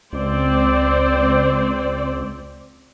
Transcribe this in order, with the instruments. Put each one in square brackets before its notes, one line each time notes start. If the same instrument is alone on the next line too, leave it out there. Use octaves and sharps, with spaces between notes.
[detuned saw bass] C#2 [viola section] C4 C5 D5